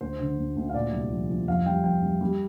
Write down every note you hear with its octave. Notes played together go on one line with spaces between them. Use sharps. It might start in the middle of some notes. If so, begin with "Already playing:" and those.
D2 C5
D3
D2
D2
F5
A#2 D5
C2
F3
F3
F2 F5
G3 G5
F2 G5
G3
G3